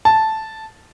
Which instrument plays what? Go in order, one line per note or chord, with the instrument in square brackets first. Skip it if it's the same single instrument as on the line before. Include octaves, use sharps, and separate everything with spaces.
[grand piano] A5